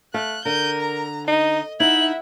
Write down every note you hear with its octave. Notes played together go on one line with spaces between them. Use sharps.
A3 F5 F#6
D3 A#4 G6 D#7
A#5
D#4 D#5
D#4 E4 E5 F#5 F#7